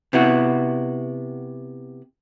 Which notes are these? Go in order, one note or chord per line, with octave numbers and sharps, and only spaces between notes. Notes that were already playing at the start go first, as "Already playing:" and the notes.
C3 B3 E4 F#4